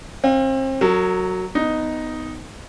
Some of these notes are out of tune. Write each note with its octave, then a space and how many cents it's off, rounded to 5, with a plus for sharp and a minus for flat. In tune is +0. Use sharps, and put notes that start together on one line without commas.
C4 +35 F5 +10
F#3 +0 A#4 -40
B3 +15 D#4 +0